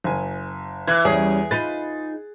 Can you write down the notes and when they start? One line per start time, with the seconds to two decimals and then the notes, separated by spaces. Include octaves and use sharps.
0.04 F#1 G#5
0.88 E3 F#6 G#6
1.05 E2 G3 C#4 G#4
1.51 D#4 F4 B4 A6